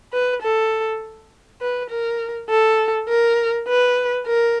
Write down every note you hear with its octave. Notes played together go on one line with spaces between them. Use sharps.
B4
A4
B4
A#4
A4
A#4
B4
A#4